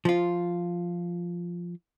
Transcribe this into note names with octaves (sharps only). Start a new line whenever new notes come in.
F3 F4